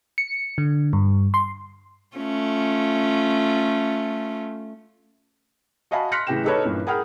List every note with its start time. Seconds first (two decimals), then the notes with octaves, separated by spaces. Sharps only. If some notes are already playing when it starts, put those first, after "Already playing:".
0.18 C#7
0.58 D3
0.93 G2
1.34 C6
2.16 A3 C#4 F4
5.91 F#4 D#5 F5 G#5 A5 B5
6.12 C6 F6 F#6 A#6 B6 C#7
6.27 A2 C#3 E3 G4 G5 E7
6.44 D#4 G4 A4 B4 C#5 B5
6.63 G2 A#2 E3 C#4
6.87 G#4 A#4 F#5 G5 B5 F6